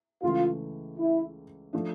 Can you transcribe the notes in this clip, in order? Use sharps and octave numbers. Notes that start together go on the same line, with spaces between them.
C#2 C#3 E3 A3 F4
E4
F3 A3 D4